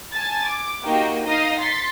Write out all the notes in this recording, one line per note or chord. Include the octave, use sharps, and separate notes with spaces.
G#5 A5 A6
D6
A#3 D#4 F#4 G4 D#5 G5
D#4 D#5 F5 D#6 A#6
C6 A6 B6 C#7